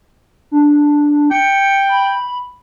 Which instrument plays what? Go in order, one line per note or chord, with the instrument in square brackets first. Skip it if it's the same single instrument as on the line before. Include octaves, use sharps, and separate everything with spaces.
[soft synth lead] D4
[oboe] G5 [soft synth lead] C#7
[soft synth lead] B5